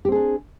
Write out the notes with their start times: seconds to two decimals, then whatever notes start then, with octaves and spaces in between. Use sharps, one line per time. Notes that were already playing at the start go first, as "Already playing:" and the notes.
0.05 G4
0.08 C4
0.12 G#4
0.16 D4